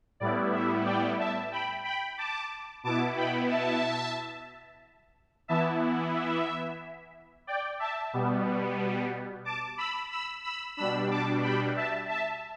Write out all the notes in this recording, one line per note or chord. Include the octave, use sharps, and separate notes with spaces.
A2 G3 B3 E4 D5
E5
D5 G5
E5 A5
G5 B5
G5 B5
A5 D6
B2 B3 E4 A5 D6
G5 B5
E5 A5
E3 B3 E4 E5 A5
E5
D5 G5
E5 A5
B2 G3 B3
A5 D6
B5 E6
B5 E6
B5 E6
B2 G3 D4 B5 E6
A5 D6
G5 B5
E5 A5
E5 A5